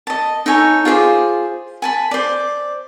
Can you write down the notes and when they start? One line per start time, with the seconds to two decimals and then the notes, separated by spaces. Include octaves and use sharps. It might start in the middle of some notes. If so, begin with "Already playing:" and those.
0.07 D#5 A5
0.46 D#4 A4 C#5 G#5
0.85 F4 G#4 C5 D6
1.82 G#5 A5 B5
2.11 C5 D5